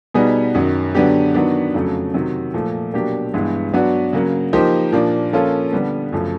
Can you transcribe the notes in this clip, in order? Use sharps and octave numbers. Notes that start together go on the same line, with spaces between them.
B2 G3 B3 D#4 G#4
F#2 D#3 F#3
D3 F#3 B3 D4 G4
D#3 F#3 B3 D4
F2 C#3 F#3 A3
C3 D#3 F#3
A#2 F3 A3
B2 F#3 A#3 D4 G4
G2 E3 G#3 B3 E4
F#3 B3 D4 F#4
C#3 F#3 A#3
F3 A#3 D#4 G4 C5
A#2 F3 A#3 D4
F3 A#3 C#4 F4 A4
D3 G3 B3
F#2 C#3 F3 A3